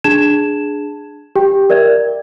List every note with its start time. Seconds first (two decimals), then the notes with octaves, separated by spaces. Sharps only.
0.04 D4 G#4 A5 G#6 E7
1.36 G4 G5
1.70 A#4 D5 E5 G#6